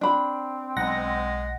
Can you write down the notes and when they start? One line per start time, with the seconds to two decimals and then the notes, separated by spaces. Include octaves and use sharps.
0.01 C4 D4 B5
0.77 B1 G#3 F#5 A#6